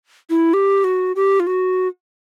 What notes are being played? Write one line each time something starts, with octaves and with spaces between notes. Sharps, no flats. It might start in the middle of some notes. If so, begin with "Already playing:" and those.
E4
G4
F#4
G4
F4
F#4